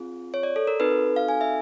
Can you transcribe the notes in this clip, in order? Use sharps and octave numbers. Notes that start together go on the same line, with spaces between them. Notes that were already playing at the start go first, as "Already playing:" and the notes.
Already playing: C4 F4 G#4
C#5
D5
A4
A#4
C4 D#4 F#4 A4 B4
F5
G#5
E5